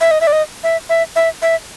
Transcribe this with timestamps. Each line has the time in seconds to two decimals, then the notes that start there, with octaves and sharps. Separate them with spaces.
0.01 E5
0.11 D#5
0.21 E5
0.27 D5
0.33 D#5
0.64 E5
0.89 E5
1.16 E5
1.42 E5